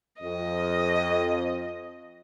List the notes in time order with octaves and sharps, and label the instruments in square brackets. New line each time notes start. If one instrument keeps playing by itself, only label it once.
[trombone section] F2 [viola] D#5